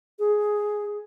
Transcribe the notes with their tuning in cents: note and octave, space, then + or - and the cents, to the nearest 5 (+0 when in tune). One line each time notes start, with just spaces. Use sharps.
G#4 +5